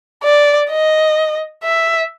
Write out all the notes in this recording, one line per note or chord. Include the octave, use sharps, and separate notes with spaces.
D5
D#5
E5